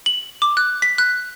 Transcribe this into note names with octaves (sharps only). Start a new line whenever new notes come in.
F#7
D6
F#6
B6
F#6